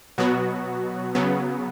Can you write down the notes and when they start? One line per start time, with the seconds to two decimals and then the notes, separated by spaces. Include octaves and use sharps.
0.18 B2 F#3 B3 F#4
1.15 C#3 F#3 B3